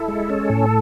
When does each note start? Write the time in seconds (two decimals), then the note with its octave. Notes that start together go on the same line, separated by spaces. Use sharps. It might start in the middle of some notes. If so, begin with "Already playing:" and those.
Already playing: E4 A4
0.08 G#3
0.30 C#4
0.50 A2